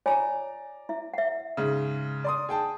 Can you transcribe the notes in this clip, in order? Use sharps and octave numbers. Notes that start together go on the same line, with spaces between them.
F4 C#5 D5 G#5 A#5
E4 E5
E5 F#5
G#2 C#3
D5 C6 D#6
G#4 G5 A5